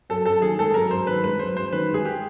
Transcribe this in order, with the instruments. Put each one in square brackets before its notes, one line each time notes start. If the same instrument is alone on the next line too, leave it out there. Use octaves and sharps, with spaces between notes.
[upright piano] F#2 [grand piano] A4
[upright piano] F#2 [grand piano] A4
[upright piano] D#3 [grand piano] G#4
[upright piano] G#3 [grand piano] A4
[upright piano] F#2 [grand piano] A#4
[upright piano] F#2 [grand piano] C5
[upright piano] D#3 [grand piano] B4
[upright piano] G#3 [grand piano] B4
[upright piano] F#2 [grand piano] C5
[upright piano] F#2 [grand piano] C5
[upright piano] D#3 [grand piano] B4
[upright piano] G#3 [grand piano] G#4
[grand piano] G4